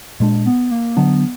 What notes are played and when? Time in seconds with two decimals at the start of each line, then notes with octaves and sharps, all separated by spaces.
0.20 A#2 G#3 D4
0.46 B3
0.71 A#3
0.96 D3 F#3 B3 D4